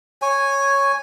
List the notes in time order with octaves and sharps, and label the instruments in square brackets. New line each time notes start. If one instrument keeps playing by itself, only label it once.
[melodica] C#5 G#5